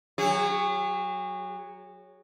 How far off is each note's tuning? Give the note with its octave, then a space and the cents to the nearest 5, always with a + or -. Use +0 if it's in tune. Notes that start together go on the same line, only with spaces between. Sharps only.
F#3 +0 G#4 -40